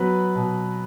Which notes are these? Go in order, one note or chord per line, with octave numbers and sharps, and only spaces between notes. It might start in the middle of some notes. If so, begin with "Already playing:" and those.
Already playing: F#3 B3 B4
B2